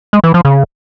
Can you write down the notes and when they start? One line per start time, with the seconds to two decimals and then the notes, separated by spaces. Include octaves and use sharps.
0.13 G#3
0.24 E3
0.34 F3
0.45 C#3